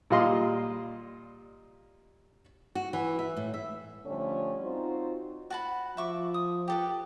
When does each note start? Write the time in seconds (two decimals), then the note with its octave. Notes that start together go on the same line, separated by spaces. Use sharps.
0.10 A#2 G3 F4 D#5 C6
2.75 F#4
2.93 E3
3.19 E5
3.37 A2
3.54 E5
4.06 D3 F3 G3 A3 C#4
4.61 C4 D#4 F4 F#4 C5
5.50 F#4 A5 B5
5.97 F3 E5 C#6 D6
6.34 D#6
6.68 G4 A4 B4